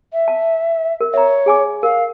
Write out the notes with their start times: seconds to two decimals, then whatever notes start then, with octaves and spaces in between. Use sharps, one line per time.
0.13 E5
0.28 A5
1.01 A#4
1.14 C#5 E5 A#5
1.46 G#4 G#5 D6
1.83 A#4 F5